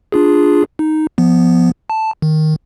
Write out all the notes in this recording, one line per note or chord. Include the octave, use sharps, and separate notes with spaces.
D4 F4 G#4
D#4
F3 B3
A5
D#3